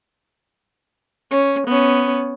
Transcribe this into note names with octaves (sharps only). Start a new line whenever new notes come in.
C#4
B3 C#4